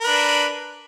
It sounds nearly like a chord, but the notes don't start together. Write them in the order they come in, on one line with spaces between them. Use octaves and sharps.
A#4 B4 D4